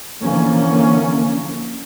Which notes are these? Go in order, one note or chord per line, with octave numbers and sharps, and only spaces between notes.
D3 E3 F3 A#3 C#4